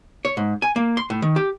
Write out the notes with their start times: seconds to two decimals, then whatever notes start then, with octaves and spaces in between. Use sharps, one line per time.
0.25 C#5
0.37 G#2
0.62 G#5
0.76 A#3
0.97 C6
1.10 A2
1.22 D#3
1.36 G4